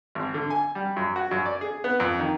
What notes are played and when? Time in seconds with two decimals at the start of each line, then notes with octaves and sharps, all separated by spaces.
0.15 G#1
0.34 D3
0.50 G#5
0.75 G3
0.96 F#2
1.16 F#4
1.31 F#2
1.46 D5
1.61 G#4
1.84 B3
2.00 F2
2.19 D#3